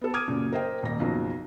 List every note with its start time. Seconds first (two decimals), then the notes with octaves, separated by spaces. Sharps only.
0.01 B3 A4
0.14 D6 D#6 F6 G#6 D#7
0.27 F#2 A#2 C#3
0.53 A#4 C5 D#5 G5
0.83 D#1 A#6
0.99 F#1 B1 C#3 F3